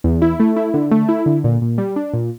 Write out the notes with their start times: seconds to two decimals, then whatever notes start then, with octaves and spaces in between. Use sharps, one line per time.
0.04 E2
0.22 E4
0.40 A3
0.56 E4
0.74 D3
0.91 A3
1.09 E4
1.26 D3
1.44 A#2
1.62 A#2
1.78 G3
1.96 D4
2.13 A#2